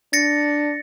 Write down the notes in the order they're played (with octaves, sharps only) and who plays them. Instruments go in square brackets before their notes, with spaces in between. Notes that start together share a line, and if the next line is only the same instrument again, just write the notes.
[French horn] D4 [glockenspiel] A6 A#6 C#7